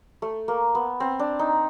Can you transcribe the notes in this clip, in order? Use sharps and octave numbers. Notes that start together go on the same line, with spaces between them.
A3
A#3
B3
C4
D4
D#4